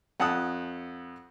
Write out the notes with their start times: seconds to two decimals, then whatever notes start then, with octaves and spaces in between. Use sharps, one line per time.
0.20 F2 F#5 A5 D#6 F#6